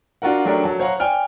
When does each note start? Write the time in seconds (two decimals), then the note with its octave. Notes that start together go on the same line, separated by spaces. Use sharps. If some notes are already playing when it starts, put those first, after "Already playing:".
0.22 D4 F4 F#4 A#4 F#5
0.45 F#3 A3 D4 G4 A#4 D5
0.64 F#3 A5
0.79 C5 C#5 F5 F#5 A#5 C#6
1.00 D5 G5 G#5 F6